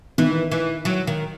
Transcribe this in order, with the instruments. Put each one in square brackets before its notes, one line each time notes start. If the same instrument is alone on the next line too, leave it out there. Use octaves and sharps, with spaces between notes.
[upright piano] D#3 [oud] E3
[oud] E3
F#3
D#3